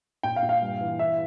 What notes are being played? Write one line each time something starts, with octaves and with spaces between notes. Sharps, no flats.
A#2 G5
F5
A#2
F5
G2
E3
E3 E5